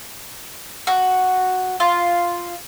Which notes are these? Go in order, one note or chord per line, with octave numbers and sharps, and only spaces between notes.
F#4
F4